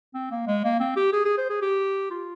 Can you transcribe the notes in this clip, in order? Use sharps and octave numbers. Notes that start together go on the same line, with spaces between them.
C4
A#3
G#3
A#3
C4
G4
G#4
G#4
C5
G#4
G4
F4